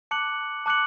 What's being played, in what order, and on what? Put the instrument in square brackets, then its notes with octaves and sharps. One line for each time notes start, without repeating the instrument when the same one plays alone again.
[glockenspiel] A5 D6 F#6 C#7 F#7
A5 D6 F#6 C#7 F#7